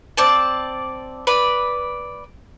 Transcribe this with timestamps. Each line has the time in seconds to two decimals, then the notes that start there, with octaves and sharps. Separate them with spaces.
0.17 C4 D5 A5
1.27 B4 D5 B5